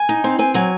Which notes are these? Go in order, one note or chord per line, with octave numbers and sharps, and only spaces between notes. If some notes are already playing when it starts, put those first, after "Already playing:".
Already playing: G#5
D#4
C4
C4 G#5
F#3 G#5